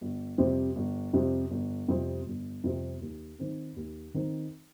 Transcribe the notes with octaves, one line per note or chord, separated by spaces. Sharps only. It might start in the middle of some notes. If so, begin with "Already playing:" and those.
G1
F2 C3 G3 C4
G1
F2 C3 G3 C4
G1
F2 C3 G3 C4
G1
F2 C3 G3 C4
D#2
D#3 C4 D#4
D#2
D#3 C4 D#4